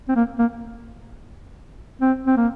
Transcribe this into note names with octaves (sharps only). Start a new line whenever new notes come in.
C4
A#3
A#3
C4
C4
A#3